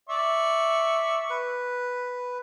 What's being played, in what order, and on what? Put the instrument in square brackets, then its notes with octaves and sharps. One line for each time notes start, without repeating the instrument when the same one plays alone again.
[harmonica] D5 E5 C#6
[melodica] B4